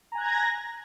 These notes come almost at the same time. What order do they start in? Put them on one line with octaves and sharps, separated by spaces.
A#5 G#5 F#6 G#6 A#6